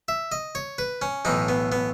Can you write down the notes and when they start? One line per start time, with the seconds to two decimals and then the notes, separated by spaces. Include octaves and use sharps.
0.08 E5
0.32 D#5
0.55 C#5
0.78 B4
1.02 C#4
1.25 B1 A2 E3 D#4
1.49 B3
1.72 B3